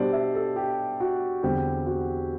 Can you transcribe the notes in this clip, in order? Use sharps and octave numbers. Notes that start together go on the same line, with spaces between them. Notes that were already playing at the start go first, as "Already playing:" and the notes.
Already playing: B2 G3 D4 C5 D5
E5
A4
G4
F#4
E2 D3 G3 C4 G4
F#4